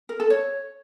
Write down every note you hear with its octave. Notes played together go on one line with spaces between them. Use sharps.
A#4
A4
C#5